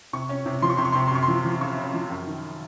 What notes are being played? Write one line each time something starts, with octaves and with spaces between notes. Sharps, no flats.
C3 C#6
C#4
C3
F3 C6
C#6
C3 C6
C#6
C6
C3 C#6
C6
F#2 C#6
C6
F3
F3
C#3 C#6
C#3
F3
F#2
D#3